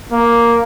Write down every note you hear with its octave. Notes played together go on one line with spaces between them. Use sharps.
A#3